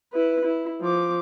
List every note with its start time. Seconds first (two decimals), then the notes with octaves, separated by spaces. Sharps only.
0.13 E4 B4
0.45 E4
0.82 F3 D6